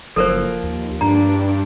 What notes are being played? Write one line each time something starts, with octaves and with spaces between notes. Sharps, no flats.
F#1 F3 A#3 A4 A#4 C5
D#2
G2 D4 A#5